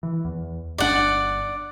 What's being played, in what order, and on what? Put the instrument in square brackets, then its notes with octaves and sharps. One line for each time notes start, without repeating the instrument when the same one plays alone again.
[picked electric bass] E3
E2
[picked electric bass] G1 D4 [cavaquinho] D5 F#5